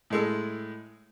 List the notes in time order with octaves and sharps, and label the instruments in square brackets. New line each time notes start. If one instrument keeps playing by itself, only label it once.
[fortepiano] A2 G#3 A4